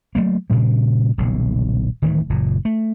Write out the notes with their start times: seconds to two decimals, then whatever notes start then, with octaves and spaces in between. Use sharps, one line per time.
0.15 F#3 A3 A#3
0.50 G2 A#2 C#3 G3
1.18 D#1 B1 C#3
2.02 D1 D#3 E3 A3
2.30 F#1 A#2
2.65 A3